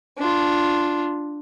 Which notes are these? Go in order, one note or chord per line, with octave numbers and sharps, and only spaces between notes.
D4 F4